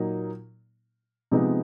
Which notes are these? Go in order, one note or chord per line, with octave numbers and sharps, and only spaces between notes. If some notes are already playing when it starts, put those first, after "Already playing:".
Already playing: A#2 F#3 A#3 D#4
C3 F3 G#3 B3 D#4